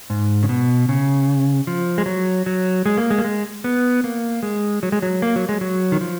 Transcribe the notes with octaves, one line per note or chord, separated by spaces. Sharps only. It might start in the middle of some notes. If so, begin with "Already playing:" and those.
G#2
C#3
B2
C#3
F3
G#3
F#3
F#3
G#3
A#3
G#3
A#3
G#3
B3
A#3
G#3
F#3
G#3
F#3
A#3
F#3
G#3
F#3
D#3
F3